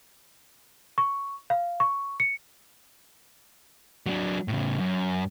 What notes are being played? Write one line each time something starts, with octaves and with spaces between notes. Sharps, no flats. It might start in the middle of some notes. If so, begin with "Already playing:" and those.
C#6
F5
C#6
C#7
F#3 D4
A2 C#3
F#2